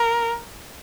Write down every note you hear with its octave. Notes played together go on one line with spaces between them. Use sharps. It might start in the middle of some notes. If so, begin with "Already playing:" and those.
Already playing: A#4